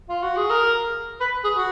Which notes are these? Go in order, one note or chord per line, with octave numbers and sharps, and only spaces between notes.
F4
F#4
G#4
A#4
B4
G#4
F#4